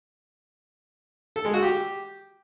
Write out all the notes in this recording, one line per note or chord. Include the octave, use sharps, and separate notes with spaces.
A4
G#3
F#4
G4